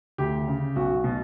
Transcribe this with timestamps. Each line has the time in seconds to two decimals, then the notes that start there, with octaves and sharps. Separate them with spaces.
0.18 D2 G4
0.47 C#3
0.76 B1 F#4
1.04 B2